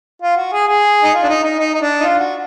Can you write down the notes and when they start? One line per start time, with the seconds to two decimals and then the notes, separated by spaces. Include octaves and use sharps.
0.22 F4
0.37 F#4
0.52 G#4
0.67 G#4
1.03 D#4
1.14 F4
1.23 D4
1.29 D#4
1.43 D#4
1.59 D#4
1.74 D#4
1.82 D4
2.00 D#4
2.03 F4
2.19 F#4